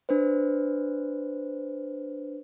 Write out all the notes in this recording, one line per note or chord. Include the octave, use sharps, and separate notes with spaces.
D4 B4 C5